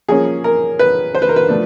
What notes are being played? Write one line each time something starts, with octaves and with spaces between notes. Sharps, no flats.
F3 A#3 C#4 G#4
A#4
B4
C5
B4
A#4
B4
F3 A3 D4